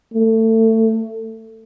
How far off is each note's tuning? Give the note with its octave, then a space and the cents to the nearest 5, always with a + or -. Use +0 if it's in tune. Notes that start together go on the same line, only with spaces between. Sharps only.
A3 +25